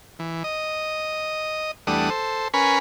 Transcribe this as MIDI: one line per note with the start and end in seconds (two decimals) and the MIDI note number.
0.19 0.43 52
0.44 1.71 75
1.87 2.10 40
1.87 2.10 55
1.87 2.10 57
1.87 2.10 62
1.87 2.10 78
1.87 2.10 87
2.10 2.48 69
2.10 2.48 72
2.54 2.79 61
2.54 2.79 70
2.54 2.79 71
2.54 2.79 80
2.54 2.79 83
2.54 2.79 85